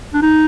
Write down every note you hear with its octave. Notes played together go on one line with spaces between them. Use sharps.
D4
D#4